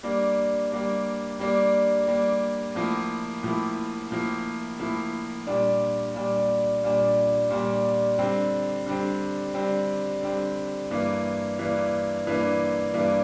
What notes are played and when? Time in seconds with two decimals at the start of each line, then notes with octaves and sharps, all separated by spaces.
0.03 G3 A#3 D4
0.72 G3 A#3 D4
1.39 G3 A#3 D4
2.07 G3 A#3 D4
2.75 A2 F3 A#3 E4
3.43 A2 F3 A#3 E4
4.11 A2 F3 A#3 E4
4.79 A2 F3 A#3 E4
5.47 A#2 G3 D4
6.14 A#2 G3 D4
6.83 A#2 G3 D4
7.51 A#2 G3 D4
8.18 D3 G3 C4
8.87 D3 G3 C4
9.54 D3 G3 C4
10.22 D3 G3 C4
10.90 G2 E3 A#3 D4
11.58 G2 E3 A#3 D4
12.26 G2 E3 A#3 D4
12.94 G2 E3 A#3 D4